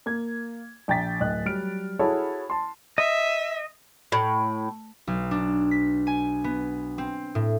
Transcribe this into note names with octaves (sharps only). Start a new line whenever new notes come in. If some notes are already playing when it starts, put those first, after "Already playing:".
A#3 G#6
A#1 G5 A#5 A6 B6
D1 D#5 F#6
F#3 G3 F6 D7
E4 F#4 G#4 A4 C#5 A5
A5 C6
D#5 E5
A2
B1
D4
B6
G#5
B3
C4
A2